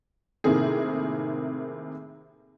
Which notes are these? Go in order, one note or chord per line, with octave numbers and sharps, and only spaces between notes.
A2 C3 D#3 A#3 C4 G#4